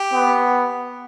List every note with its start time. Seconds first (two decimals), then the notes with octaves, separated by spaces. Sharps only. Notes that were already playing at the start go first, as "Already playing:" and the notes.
Already playing: G4
0.13 B3